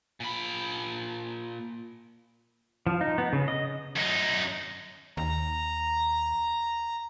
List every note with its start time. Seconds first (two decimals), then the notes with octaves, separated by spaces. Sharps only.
0.20 A#2 B5
2.87 F3
3.01 D#4
3.18 B3
3.33 C#3
3.48 D#5
3.96 F#2 D#4
5.17 D#2 A#5